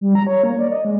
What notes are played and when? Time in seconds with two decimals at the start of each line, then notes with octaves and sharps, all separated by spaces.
0.01 G3
0.15 A#5
0.27 C#5
0.43 A#3
0.59 D5
0.71 D#5
0.85 G#3